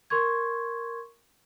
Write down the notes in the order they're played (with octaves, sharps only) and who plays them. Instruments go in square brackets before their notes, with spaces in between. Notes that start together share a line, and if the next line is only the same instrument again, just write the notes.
[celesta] A#4 C6 C#6 G#6